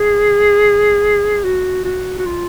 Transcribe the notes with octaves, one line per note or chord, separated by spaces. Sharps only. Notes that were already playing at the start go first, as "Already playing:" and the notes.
Already playing: G#4
F#4
F#4
F#4
F4